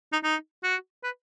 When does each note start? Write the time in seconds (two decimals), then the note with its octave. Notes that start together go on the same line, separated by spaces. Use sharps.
0.13 D#4
0.23 D#4
0.64 F#4
1.03 B4